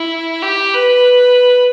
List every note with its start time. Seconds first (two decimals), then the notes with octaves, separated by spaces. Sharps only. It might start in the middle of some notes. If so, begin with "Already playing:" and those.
Already playing: E4
0.42 G4
0.73 B4